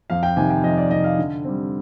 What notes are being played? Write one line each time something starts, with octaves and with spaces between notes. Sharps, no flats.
F2 F5
G5
C3 D#3 G#5
G5
F2 D#5
D5
C3 D#3 D#5
F5
D3
G3 C4